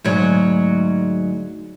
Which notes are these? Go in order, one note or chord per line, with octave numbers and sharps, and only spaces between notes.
D2 G#2 F#3